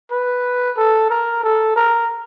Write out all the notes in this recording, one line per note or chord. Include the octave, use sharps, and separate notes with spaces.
B4
A4
A#4
A4
A#4